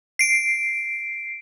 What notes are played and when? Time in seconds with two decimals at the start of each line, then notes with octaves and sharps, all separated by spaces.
0.19 C7 D7